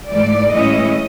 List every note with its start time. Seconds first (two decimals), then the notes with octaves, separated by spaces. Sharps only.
0.10 G#2 E3 A3 D5
0.51 A2 E3 G#3 C#4 E4 D#5